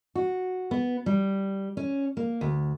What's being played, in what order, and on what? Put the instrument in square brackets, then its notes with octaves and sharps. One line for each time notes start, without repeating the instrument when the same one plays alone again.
[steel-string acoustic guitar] F#4
B3
G3
C#4
A#3
D2